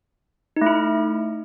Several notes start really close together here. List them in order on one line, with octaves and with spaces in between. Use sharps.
D#4 A3 E4